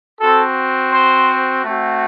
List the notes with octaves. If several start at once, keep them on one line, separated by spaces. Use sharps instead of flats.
C4 F#4 A4
C5
A3 C4 F#4